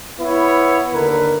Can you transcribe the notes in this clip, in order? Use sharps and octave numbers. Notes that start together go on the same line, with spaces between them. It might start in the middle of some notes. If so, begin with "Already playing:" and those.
B3 E4 B4 C#5
D#2 D3 A#4 B4